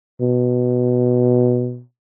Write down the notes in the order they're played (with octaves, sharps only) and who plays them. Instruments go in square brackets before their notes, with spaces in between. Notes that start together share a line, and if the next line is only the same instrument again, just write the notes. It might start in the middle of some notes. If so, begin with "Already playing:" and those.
[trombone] B2